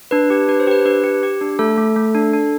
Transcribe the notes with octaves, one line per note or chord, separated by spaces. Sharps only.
D4 B4
G4
D4 B4
C5
G4 B4
D4 B4
G4
G4
D4
A3 A4
A3
A3
D4
D4